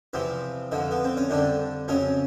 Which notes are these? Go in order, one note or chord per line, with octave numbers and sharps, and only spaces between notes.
E2 C3 F3 C4
F2 D3 F3
B3
C4
C#4
F2 D3 G3 D4
F2 C#3 F#3 C#4